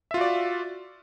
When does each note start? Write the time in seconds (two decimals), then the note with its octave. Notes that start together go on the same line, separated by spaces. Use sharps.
0.11 E5
0.14 F4
0.18 F#4
0.21 D5